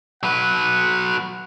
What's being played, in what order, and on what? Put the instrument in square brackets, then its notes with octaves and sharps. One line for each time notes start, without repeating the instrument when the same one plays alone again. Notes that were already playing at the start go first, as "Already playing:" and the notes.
[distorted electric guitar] F#3 B4 [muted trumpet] F#5